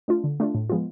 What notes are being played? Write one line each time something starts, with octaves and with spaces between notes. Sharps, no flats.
A3 D4 F4
D3
A3 D4 F4
A2
F3 G#3 B3 F4